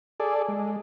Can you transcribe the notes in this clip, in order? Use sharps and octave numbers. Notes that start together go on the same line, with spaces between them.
G#4 A4 D5
G#3